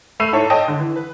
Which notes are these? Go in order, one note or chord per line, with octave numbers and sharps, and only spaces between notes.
A3 B5 E6 C7 D#7 F7
G#2 E4 A4 C#5
C#5 D#5 G5 A5 D#6
D3
E3
B4